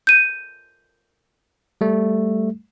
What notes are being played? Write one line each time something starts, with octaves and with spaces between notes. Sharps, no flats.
G6 D#7
G3 A3